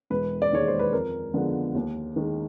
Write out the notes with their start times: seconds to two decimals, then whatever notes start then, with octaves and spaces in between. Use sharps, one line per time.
0.10 E1 B4
0.42 D5
0.52 D#2 D#3 G#3 C#5
0.68 C5
0.79 B4
0.93 F2 A#4
1.33 D3 F3 G#3 B3
1.75 D#2
2.16 D#3 G#3